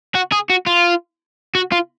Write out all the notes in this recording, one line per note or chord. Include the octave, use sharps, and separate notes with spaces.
F#4
G#4
F#4
F4
F#4
F4